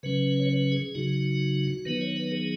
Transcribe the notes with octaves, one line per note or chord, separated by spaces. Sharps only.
C#3 F#3 C#4 B4
C#5
B4
G#4
C#3 F#3 D#4 F#4
D#3 F#3 B3 D#4 B4
C#5
B4
G#4